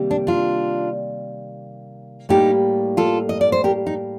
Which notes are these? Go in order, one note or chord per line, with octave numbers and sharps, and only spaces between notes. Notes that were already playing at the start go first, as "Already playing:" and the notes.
Already playing: C3 D#3 G3 A#3
D4
D4 F4
A2 G3 A#3 D#4 G4
F4 A4
D#5
D5
C5
G4 A#4
D#4